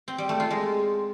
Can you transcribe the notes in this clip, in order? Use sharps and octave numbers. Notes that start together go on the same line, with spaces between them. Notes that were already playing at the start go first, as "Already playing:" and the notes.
C4
G3
A3
F4
G#3